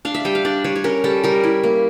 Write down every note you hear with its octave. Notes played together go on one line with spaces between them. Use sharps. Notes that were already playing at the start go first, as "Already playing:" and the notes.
D4 F5
E5
G3 G5
F5
D4 D5
G3 C#5
C#5
C#4 A#4
G3 A4
G3 A#4
E4
A#3